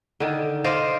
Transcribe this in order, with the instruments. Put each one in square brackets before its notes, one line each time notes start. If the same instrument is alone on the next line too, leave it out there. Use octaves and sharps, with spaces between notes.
[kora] D3 D#3
C5 D5 D#5 F5